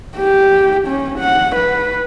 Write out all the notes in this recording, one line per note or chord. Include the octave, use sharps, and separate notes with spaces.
G4
C#4
F#5
B4